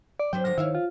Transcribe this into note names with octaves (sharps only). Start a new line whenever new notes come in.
D5
F#3 C4 D4 B4 G5
D3 F3 D4 A#6
D#3 E4 C#5 E5 F5
F4